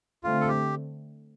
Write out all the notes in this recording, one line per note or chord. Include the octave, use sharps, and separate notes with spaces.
D3 A3 C4 F4
A4
G4